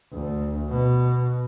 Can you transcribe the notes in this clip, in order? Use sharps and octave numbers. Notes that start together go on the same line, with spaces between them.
D2
B2